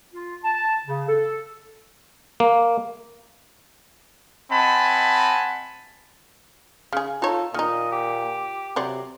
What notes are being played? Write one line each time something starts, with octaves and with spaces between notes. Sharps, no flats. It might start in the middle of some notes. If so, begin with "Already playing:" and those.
F4
A5
C#3
A4
A#3
C4 D#5 F#5 G#5 A5 B5
C#3 G#4
D#4 F4 A4 C#5
A#2 D#3 D#4 D#5
G4
C3 F#3 C5 D5